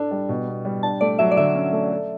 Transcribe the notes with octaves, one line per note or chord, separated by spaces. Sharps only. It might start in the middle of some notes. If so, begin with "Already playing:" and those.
Already playing: D4 A4
G3
B2
B3
G3
D4 A5
A3 D5
F#3 E5
D5
D3 E5
C#4
A3
A4